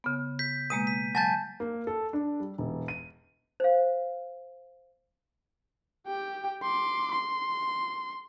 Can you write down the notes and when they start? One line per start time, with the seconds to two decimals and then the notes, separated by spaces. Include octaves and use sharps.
0.04 C#3 B3
0.39 G6 B6
0.70 B2 G#3 A#3 D#7
0.87 B6
1.15 F#3 G#5 A5 G6 A6
1.60 A#3
1.87 A4
2.13 D4
2.40 G3
2.58 E1
2.88 D#7
3.60 C5 F5
6.07 G4 G5
6.63 C6 D6
7.12 C6